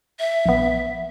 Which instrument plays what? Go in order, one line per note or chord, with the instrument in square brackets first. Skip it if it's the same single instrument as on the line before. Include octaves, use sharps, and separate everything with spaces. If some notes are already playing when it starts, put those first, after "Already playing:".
[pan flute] E5
[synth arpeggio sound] A#1 B3